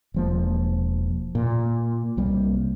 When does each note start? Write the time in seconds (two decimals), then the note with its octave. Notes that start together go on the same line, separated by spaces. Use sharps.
0.14 E1 F3 A#3
1.35 A#2
2.17 C2 G3 A#3